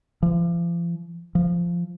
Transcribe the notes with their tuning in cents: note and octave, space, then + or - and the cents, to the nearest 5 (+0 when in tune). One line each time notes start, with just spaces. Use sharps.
F3 -40
F3 -10